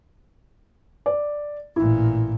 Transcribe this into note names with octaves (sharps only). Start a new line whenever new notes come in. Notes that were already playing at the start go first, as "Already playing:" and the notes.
D5
A1 A#2 E4